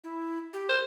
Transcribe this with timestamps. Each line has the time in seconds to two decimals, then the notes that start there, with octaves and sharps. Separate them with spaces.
0.04 E4
0.53 G4
0.69 A#4 C5